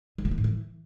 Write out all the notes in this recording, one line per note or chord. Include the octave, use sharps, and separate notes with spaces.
D#3
C#3
E3
A2
E3